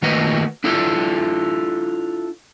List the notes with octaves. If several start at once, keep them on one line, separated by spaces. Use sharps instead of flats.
D#3 A3 A#3 F#4 B4 D#5
D4 E4 F4 A4